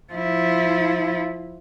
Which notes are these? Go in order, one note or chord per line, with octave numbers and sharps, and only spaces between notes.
F3 E4